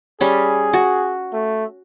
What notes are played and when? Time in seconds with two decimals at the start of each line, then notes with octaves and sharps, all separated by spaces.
0.21 G3 C#4 G#4
0.73 F#4
1.33 A3